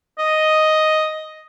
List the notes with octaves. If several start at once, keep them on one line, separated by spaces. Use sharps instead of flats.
D#5